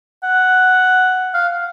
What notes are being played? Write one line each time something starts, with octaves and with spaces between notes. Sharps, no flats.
F#5
F5